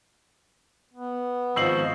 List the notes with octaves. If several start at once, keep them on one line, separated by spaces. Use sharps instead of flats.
B3
G#1 F3 D#5 C#6 E6 C7 F#7